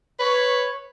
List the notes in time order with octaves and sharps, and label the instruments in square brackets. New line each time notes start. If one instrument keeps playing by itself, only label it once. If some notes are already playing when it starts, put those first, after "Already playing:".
[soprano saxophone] B4 [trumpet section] C#5